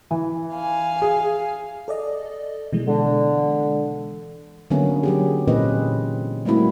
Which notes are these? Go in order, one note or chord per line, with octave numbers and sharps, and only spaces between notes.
E3
F5 G#5
G#4
A4 D5 D#5
B2 E3 G#3
D3
D3 F#3 A#3 B3 C#4
F#3 G4 G#4
A#2 E3 C4 C#4 B4 D#5
G3 A3 A#3 C4 E4 F#4